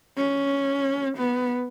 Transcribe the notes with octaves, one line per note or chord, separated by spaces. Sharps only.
C#4
B3